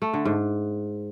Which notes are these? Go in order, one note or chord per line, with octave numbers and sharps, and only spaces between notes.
A3
D3
G#2